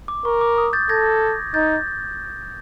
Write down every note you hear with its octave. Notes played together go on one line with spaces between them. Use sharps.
D6
A#4 C#6
D6
D#6
G6 A6
A4 G#6 A#6
D#4 G6 A6